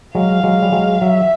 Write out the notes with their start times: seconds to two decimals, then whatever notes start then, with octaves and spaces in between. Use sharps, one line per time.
0.15 F#3 G#3 F5
0.43 F#3 G#3
0.62 G3
0.72 F#3 G#3
1.01 F#3 E5